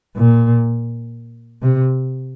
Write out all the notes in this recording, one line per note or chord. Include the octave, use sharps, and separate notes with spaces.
A#2
C3